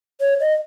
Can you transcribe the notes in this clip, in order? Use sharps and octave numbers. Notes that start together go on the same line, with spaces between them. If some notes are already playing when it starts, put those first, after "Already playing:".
C#5
D#5